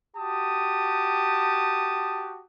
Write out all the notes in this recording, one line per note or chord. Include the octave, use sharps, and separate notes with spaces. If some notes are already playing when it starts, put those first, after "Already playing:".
F#4 G4 A5 D#6